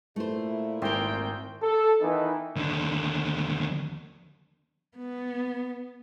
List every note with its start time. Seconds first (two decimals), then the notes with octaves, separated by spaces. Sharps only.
0.16 A#2 A3 E4 C5
0.82 G#1 C4 A#4 G5 C6
1.63 A4
2.02 D#3 E3 B3 D#4 E4
2.56 D#2 D3
4.97 B3